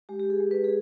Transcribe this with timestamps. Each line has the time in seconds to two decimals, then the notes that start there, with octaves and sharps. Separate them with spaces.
0.09 G#3 G4
0.19 G4
0.30 G#4
0.40 G#3
0.51 B4
0.64 G#4